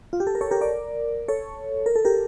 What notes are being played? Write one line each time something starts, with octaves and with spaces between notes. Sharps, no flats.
F4
G4
A4
A#4
A4 C#5
G4 A#4
A#4 D5
A4 C#5
A#4
A4
G4 A#4